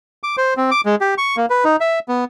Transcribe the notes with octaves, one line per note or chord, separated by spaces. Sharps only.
D6
C5
C4
D6
G#3
G4
C#6
A#3
B4
D#4
E5
B3